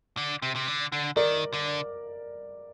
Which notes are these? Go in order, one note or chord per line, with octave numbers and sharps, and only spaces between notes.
D3
C3
C3
D3
D3
D#3 A#4 D5
D3